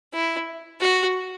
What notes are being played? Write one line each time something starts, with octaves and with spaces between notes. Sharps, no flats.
E4
F#4